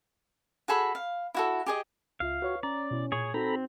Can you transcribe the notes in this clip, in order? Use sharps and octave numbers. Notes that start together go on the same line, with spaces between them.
F#4 G#4 A4 B5
F5
E4 F#4 A4
G4 G#4 D#5
C#2 F4 E5 F5
F#4 B4 C#5 C#6
C#4 D5 A#5
B2 E4
A#2 G#4 C#5
C4 D#4 F#4 A4 A#5 B5